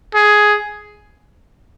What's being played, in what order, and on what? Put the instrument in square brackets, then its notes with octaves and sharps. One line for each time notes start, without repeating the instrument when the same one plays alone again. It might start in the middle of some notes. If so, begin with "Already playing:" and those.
[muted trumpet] G#4